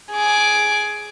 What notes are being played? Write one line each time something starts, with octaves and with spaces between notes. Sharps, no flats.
G#4 D6